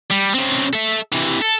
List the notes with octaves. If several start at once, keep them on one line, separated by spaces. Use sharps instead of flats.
G3
C#3 C4
A4 E5
C3 E3
A4